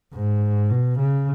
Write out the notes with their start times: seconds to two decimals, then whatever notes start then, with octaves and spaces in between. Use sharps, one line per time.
0.14 G#2
0.70 B2
0.99 C#3